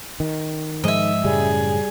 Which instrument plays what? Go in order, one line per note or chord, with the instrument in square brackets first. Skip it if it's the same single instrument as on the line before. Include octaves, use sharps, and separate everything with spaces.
[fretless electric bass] D#3
[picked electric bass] G#2 F3 G#3 [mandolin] D#5 E5
[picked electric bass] F#2 A2 C#3 [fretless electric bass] G3 [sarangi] G#4